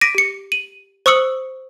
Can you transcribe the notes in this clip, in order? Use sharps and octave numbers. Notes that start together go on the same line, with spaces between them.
D6 A#6 B6 D7 D#7
G4 C#7
D#7 F#7
C5 C#6 D#6 E6 C#7 F#7